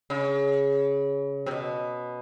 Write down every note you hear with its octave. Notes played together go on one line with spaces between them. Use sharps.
C#3
C3
B2